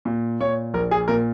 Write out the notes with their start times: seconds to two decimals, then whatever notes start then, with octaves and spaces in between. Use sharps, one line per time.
0.05 A#2
0.40 A#2 C#5
0.74 A#1 A#4
0.91 G#4
1.08 A#2 A#4